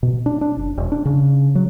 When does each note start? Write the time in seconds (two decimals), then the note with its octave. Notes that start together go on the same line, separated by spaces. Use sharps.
0.03 B2
0.26 D4
0.41 D4
0.57 F#1
0.78 E1
0.92 D4
1.05 C#3
1.55 F#3